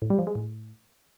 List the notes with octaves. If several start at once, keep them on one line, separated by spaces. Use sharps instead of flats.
A2
G3
F3
G#3
A2